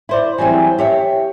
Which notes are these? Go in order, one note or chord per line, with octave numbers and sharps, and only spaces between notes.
E4 C5 D5
E3 F#3 G3 C4 G#4
G4 C#5 E5